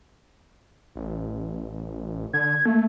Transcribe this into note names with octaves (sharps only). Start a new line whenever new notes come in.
A1
D3 G#6
A3 A#3